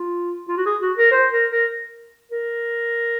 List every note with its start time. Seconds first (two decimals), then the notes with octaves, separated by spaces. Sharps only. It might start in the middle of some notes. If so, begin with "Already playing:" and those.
Already playing: F4
0.48 F4
0.57 F#4
0.66 G#4
0.81 F#4
0.97 A#4
1.12 C5
1.32 A#4
1.51 A#4
2.32 A#4